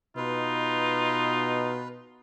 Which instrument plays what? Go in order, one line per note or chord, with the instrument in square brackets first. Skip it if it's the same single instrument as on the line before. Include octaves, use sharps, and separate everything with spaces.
[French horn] B2 [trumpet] D#4 [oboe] F4 [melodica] B4